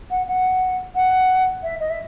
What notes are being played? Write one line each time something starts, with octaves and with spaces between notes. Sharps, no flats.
F#5
F#5
F#5
E5
D#5
E5